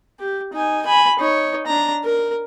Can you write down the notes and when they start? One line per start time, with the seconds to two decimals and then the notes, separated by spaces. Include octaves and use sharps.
0.20 G4
0.53 D#4 G#5
0.86 G#5 B5
1.19 D#4 C#5
1.66 D4 A#5
2.04 A#4